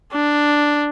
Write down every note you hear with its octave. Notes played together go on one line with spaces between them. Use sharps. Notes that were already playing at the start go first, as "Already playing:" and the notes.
D4